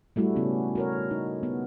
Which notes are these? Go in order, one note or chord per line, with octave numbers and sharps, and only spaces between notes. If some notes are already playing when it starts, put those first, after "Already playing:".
G3 A3 E4 F#4
C#3 B3 C#4
F#4 A#4 C#5
D#4
B3